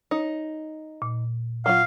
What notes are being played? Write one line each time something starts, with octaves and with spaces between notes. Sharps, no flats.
D#4 C#5
A#2
F#3 F4 F5